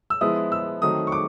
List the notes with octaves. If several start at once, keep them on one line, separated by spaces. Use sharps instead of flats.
E6
F3 G#3 B3 E4 D#6
E6
D#3 F#3 A3 C4 D#4 D#6
C#6
D6